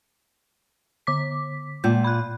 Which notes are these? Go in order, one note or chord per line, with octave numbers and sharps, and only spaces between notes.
D3 D6 B6
A#2 G#3 G6
B5 F#6